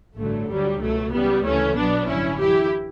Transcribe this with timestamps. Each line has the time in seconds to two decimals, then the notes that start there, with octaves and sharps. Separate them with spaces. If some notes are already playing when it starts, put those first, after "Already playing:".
0.17 A1 G2 D3 F#3 A3
0.49 D2 D3 F#3 G3
0.80 C#2 B2 F#3 A3
1.12 C#2 C#3 E3 G3 B3
1.44 D2 C#3 E3 A3 C#4
1.76 B1 B2 F#3 B3 D4
2.07 A1 G2 D3 F#3 C#4 E4
2.39 F#2 E3 E4 G4